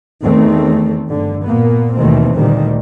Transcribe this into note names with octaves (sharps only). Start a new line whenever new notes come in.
E2 D#3 A3 C4
G1 D3
A#2 A#3 B3
D#2 B2 D#3 E3 A3 C4
D2 A#2 D#3 G3